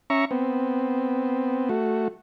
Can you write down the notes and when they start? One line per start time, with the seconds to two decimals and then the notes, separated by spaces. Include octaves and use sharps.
0.10 C#4 E5 A#5 C#6
0.31 B3 C4
1.69 A3 F#4